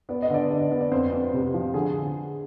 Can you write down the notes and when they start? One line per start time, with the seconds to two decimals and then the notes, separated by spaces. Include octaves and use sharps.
0.09 B3 D5
0.22 D#5
0.30 D3 D5
0.50 D4
0.72 B3
0.81 D5
0.91 F2 C5
1.12 F2
1.33 C3
1.54 F3
1.74 D3 G#4